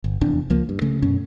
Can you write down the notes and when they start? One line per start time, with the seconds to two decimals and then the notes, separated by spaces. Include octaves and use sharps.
0.04 G1
0.21 F1 E2 C3 D4
0.50 C#2 F3 A#3
0.69 G2
0.82 C#3 A3
1.02 F#2 B2 C#4